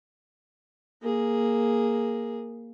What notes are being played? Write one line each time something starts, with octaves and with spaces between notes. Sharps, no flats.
A#3 G#4